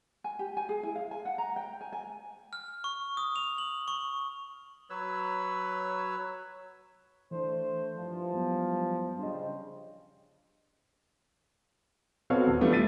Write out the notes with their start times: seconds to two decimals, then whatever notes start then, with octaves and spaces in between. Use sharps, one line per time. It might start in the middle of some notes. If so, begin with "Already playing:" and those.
0.24 G#5
0.39 G4
0.57 G#5
0.69 G#4
0.83 E4
0.96 F5
1.11 G#5
1.25 F#5
1.38 A#5
1.56 G5
1.81 G#5
1.93 G#5
2.53 F6
2.84 C#6
3.17 D#6
3.36 F7
3.58 F#7
3.88 C#6
4.90 F#3 B4 C#5 E6
7.31 E3 A3 D4 C5
7.96 G2 E3 F3
8.33 F#3 G3 B3
9.19 C#3 G3 D4 C5 D#5
12.30 B3 C4 F#4 A4 C#5 F5
12.47 D#1
12.61 F3 G3 A3 B3 D4
12.73 A6 B6 D#7